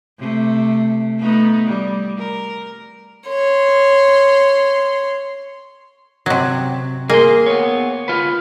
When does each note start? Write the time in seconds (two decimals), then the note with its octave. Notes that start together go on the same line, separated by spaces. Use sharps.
0.19 C3 A3
1.18 A3 B3 D#4
1.67 G3
2.18 A#4
3.27 C#5 C6
6.26 C3 F#3
7.10 A#3 G#4 C6
7.46 B3 C#5
8.08 F4 B4